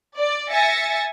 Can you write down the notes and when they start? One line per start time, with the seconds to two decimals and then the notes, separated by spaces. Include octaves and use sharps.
0.17 D5
0.51 E5 G#5 A6 A#6 C#7